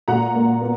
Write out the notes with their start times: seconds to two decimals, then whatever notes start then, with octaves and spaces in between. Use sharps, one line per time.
0.08 A#2 F#5 A#5
0.35 A#3
0.61 B3